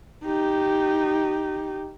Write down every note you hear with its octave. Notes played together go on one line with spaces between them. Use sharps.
D#4 G4